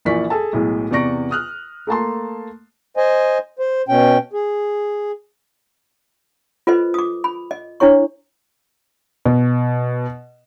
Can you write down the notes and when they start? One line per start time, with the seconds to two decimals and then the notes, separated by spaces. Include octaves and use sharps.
0.05 A#1 E3 A#4 D5 C#6 B6
0.30 G#4 A4 A5
0.53 B1 A2 G#3
0.91 E2 C3 D5 C#6 A#6 D7
1.31 D#6 F6 F#6
1.87 A3 A#3 A5 C6
2.97 C5 D#5 G#5
3.59 C5
3.88 B2 C#4 G5
4.33 G#4
6.67 F4 A4 B4 C5 D#5
6.94 D6 D#6
7.24 B5
7.51 D#5
7.80 D4 E4 C#5 C#6
9.26 B2